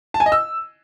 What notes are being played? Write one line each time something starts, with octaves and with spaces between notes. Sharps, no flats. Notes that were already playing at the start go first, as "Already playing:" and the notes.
A5
G#5
D#5
E6